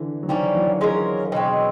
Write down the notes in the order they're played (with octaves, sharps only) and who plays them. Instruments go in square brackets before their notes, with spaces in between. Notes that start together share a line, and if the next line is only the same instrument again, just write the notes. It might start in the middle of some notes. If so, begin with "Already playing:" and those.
Already playing: [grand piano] D3 E3
F#3
[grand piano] D#3 F3 [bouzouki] G3 A#3 C#4
[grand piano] E3 F#3
[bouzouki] G#3 C#4 F4 A#4
B2 G#3 C4